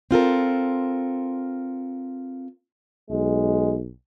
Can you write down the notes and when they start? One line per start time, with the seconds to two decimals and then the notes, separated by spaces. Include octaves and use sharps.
0.11 C4 F4 A4 A#4
3.11 B1 G#3